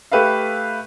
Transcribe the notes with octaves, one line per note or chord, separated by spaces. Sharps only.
A3 G4 B4 E5 F5